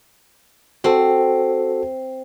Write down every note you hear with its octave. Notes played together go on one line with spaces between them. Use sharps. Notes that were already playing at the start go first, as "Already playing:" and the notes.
C4 F#4 A4